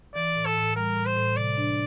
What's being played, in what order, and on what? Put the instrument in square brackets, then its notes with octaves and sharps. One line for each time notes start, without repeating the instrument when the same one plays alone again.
[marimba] E3 [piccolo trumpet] D5
[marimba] A2
[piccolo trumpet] A4
[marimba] A2
[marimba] G3 [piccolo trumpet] A#4
[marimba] A2
[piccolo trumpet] C5
[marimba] A2
[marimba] C3 [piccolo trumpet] D5
[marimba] D4